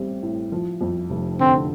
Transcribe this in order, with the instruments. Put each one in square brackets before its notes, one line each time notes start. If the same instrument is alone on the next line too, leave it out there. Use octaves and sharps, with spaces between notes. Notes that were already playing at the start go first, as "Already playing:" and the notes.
Already playing: [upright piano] A1 A2 G3 C4
A2
F3
F2
F1
[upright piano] D3 [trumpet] C4